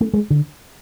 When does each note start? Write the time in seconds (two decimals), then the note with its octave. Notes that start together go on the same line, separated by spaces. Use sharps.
0.01 A3
0.13 G#3
0.30 D3